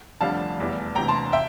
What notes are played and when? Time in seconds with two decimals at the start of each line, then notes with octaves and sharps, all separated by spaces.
0.21 F1 F2 D3 G3 F5 A5
0.59 F1 E2 E3 G3
0.95 E1 D2 C3 E3 G5 A#5
1.08 A5 C6
1.32 E5 G5